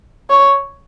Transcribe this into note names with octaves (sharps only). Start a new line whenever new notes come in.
C#5